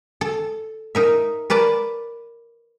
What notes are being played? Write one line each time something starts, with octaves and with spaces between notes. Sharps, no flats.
A4
D#4 A#4 E5
A#4 B4 D5 A5